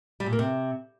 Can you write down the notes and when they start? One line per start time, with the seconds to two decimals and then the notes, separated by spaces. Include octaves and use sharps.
0.20 G3
0.26 A#2
0.33 A#3
0.39 C3